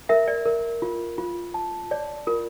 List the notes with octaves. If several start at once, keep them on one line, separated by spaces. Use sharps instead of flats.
A#4 E5
D5
A#4
F4
F4
A5
C#5 D5
F4 A#4